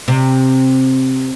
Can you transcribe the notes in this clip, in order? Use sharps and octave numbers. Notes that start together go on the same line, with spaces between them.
C3